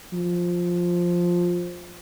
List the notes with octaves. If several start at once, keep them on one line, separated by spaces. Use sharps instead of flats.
F3